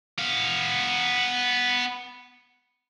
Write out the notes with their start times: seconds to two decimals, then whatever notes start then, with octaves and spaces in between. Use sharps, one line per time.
0.19 B3 F5